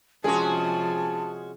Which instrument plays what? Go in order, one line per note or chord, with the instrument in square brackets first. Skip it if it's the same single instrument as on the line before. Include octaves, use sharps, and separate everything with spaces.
[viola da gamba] C3 F3 [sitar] G#3 C#4 F#4 [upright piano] G#4 [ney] A5